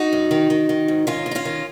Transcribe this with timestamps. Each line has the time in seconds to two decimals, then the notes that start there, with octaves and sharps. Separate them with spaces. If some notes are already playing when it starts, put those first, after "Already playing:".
Already playing: D#4 F#4
0.13 F#2
0.31 D#3
0.50 D#3
0.69 D#3
0.88 G#2
1.07 D#3 C#4 F4
1.26 D#3
1.31 D#4
1.35 C#4 F4
1.45 D#3